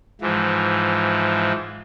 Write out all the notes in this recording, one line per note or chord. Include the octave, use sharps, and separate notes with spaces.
G#2 E3 F3